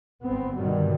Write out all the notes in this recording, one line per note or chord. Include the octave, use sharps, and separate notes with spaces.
G1 B3 C4
G2 B2 D3 D#3 F#3 G3